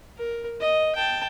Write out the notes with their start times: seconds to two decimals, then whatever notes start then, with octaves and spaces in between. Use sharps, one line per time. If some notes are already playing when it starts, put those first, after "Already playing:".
0.18 A#4
0.60 D#5
0.95 G5 A5